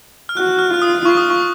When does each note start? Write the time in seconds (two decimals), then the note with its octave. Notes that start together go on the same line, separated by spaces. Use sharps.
0.29 F6
0.37 F#4 F#6
0.59 F6
0.71 F4 F6
0.82 D#6
1.05 F4 C#6
1.17 D#6
1.30 C#6